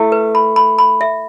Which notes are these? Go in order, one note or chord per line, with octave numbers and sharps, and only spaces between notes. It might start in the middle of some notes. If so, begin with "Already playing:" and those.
Already playing: A3 E4
B4
B5
B5
B5
E5